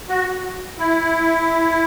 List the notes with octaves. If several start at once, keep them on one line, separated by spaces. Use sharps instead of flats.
F#4
E4